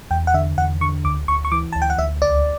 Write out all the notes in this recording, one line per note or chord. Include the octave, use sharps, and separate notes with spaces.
E2 G5
F#5
D3 E5
E2 F#5
D3 C#6
D2 D6
D2 C#6
C#6
E3 D6
D2 A5
G5
F#5
D2 E5
C#2 D5